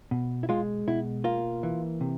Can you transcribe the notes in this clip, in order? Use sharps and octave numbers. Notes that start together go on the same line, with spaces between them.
B2
E4
G#3 F4
B2 E4
A#3 F4
E3
C3